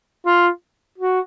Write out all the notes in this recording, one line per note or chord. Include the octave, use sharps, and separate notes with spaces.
F4
F#4